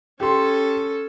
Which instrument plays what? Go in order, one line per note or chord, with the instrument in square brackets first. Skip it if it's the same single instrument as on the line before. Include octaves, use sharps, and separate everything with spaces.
[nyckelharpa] C#4 A4 [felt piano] G4 C6